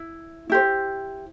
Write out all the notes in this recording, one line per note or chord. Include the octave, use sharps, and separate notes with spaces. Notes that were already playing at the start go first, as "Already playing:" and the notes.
Already playing: E4
E4 G4 C5